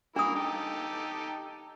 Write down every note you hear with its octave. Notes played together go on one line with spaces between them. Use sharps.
A#3 D4 E4 D#6
D#4 G4 A4